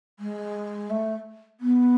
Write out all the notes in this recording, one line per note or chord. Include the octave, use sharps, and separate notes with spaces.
G#3
A3
B3